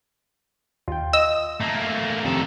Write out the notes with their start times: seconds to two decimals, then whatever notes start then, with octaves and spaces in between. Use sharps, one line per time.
0.88 D#2 F4 G5
1.13 D#5 E6
1.61 A3 A#3
2.25 F2 C3 D#3 A4 A#5